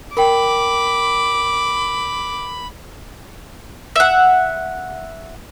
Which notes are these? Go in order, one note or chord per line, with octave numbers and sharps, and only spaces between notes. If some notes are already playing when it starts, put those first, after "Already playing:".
A#4 G5 B5 D6
E5 F#5